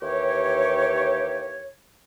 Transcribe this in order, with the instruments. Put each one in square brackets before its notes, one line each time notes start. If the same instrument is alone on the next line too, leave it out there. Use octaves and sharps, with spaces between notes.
[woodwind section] D#2 E3 G4 C#5